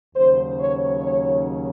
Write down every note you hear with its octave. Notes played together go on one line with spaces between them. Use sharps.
D#2 C#3 F#3 C5
C#5
C#5